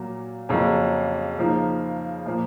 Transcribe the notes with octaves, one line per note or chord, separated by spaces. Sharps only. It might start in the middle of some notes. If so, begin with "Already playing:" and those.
Already playing: A#2 F#3 A#3
F2 C#3 F#3 A#3 C#4
C#3 F3 A#3 D#4
A#2 F3 A#3